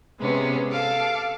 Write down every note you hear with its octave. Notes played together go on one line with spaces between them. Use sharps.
C3 G#3 B3 C#4
A4 F5 A5 D6